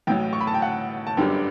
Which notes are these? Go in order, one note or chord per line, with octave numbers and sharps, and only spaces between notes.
A1 A2 F#3 G5
C#6
B5
A5
G5
F#5
A5
G1 F#2 D3 G3 G5